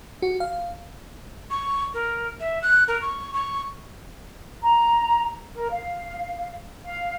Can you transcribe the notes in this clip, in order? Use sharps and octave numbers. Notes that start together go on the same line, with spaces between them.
F#4
F5
C#6
A#4
E5
F#6
A#4
C#6
C#6
A#5
A#4
F5
F5